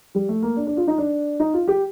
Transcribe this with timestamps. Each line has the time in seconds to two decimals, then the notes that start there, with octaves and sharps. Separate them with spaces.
0.15 G3
0.29 A3
0.42 A#3
0.56 D4
0.67 D4
0.77 F4
0.87 D#4
0.98 D4
1.40 D#4
1.54 F4
1.68 G4